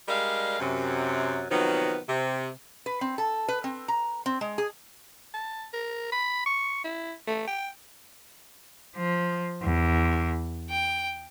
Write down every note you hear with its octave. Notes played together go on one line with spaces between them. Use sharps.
G3 G#3 D4 A#4 D#5 F5
F#2 C3
C3 D#3 F3 F#3 B3
C3
B4
C4
A4
B4
C4
A#5
C4
G#3
G#4
A5
A#4
B5
C#6
E4
A3
G5
F3
E2
G5